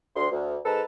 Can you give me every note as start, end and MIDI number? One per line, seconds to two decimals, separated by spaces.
0.16 0.26 38
0.16 0.26 84
0.31 0.57 38
0.65 0.82 44
0.65 0.82 56
0.65 0.82 69
0.65 0.82 71
0.65 0.82 81
0.65 0.82 82